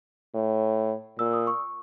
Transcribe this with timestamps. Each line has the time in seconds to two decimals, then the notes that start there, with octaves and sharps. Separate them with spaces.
0.34 A2
1.19 A#2 E6
1.33 D#6
1.47 C#6